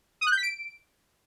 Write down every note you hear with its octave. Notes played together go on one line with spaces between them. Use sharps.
D#6
F#6
G6
B6
D7